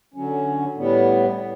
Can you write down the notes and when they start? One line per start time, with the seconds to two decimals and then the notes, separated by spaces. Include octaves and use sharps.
0.14 D3 F#3 C#4
0.76 A2 G3 B3